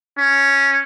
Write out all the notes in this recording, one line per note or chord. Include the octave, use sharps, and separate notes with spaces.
C#4